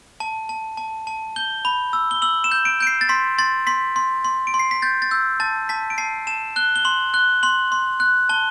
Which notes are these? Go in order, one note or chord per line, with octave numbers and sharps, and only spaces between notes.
A5
A5
A5
A5
G6 G7
B5
E6
G7
E6 F#7
E7
G6
D7
G6 D7
C7
A6
C6 B6
C6 A6
C6 B6
C6
C6
D7
C6
C7
B6
G6 A6
A6
E6 G6
A5 A6
A5 B6
D7
A5 C7
A5 E7
F#6 G7
G7
C6 F#7
F#6 G7
C6 F#7
C6
F#6
A5 G7